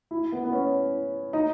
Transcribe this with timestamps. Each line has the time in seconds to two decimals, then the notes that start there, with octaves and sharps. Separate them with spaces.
0.11 E4
0.32 B3
0.44 B3
0.53 C#4
1.33 D#4